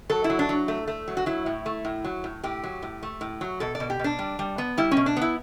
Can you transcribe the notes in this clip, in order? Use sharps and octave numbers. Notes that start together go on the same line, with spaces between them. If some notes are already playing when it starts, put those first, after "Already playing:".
F#3 A4
E4
F#3
D4
F#3
A3
A3
F#3
F#4
F#3 E4
A2
A3
A2
F#3
A2
A2 G4
F#3
A2
A3
A2
F#3
B2 A4
D5
B2
G4
B2 D4
G3
G3
B3
G3 E4
C#4
B2
D4
B3 E4